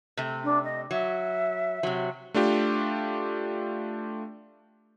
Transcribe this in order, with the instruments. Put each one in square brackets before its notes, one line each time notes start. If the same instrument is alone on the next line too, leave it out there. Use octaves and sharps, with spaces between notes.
[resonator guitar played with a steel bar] C3 A3
[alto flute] D4
D#5
[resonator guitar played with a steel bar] F#3 [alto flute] E5
[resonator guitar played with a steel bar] C3 F#3
[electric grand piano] A3 D4 F4 G4